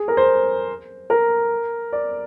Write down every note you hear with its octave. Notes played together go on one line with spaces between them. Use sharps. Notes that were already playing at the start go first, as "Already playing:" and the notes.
Already playing: G#4
A#4
C5
A#4
D5